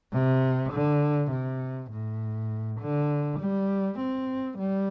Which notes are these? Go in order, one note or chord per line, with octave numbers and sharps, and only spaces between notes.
C3
D3
C3
A2
D3
G3
C4
G3